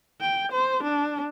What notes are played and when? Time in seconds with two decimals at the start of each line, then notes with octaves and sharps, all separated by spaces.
0.21 G5
0.52 C5
0.84 D4